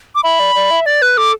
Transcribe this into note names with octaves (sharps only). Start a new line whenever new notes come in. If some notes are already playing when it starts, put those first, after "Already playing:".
D6
E5 B5
D5
D5
E5
D5 A6
B4 F#6
A4 D6